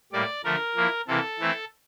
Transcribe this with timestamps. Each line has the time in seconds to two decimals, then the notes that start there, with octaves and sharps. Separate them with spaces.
0.12 A2 G3 A#3 D5
0.44 D3 F3 A3 A#4
0.76 F3 A#3 E4
1.07 C3 E3 A#3 A4
1.39 E3 A3 C4 E4